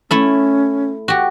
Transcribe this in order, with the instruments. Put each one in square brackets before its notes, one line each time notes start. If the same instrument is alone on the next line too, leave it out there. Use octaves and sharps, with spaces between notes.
[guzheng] A3 E4 A4 [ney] C#4
[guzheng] F#4 G4